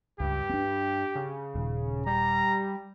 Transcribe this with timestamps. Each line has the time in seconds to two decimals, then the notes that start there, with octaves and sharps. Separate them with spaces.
0.20 C#2 G2 G4
0.50 C4 D4
1.15 C#3
1.55 D#1
2.07 G3 A#5